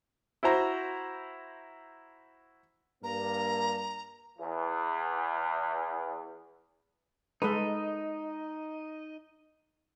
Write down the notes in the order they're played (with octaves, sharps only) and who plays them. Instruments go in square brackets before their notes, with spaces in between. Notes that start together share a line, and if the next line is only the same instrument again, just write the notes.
[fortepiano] E4 F#4 C5 A#5
[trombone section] G2 A#3 [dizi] A#5
[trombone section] E2 E3
[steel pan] G#3 A4 B4 [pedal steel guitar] D#4 D#5